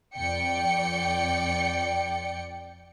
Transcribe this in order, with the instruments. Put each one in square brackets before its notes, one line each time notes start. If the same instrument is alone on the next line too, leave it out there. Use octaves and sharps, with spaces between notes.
[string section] F2 D5 G5 C#7